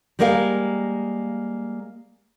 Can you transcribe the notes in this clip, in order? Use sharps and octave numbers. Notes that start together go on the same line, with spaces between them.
G3 G#3 A#3 A#4 E5 F5